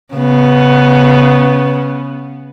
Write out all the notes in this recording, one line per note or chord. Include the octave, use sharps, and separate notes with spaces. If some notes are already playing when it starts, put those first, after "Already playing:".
C#3 B3